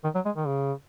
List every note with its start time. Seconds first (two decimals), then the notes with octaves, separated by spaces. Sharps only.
0.04 D#3
0.15 F#3
0.25 G#3
0.37 D#3
0.47 C#3